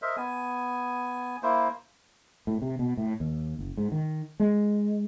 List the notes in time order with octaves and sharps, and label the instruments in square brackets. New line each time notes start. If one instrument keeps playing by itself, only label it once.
[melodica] A#4 C5 D#5 E5
B3 G#5
A#3 E4 C5
[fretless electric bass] A2
C3
B2
A2
D#2
F#1
G#2
D#3
G#3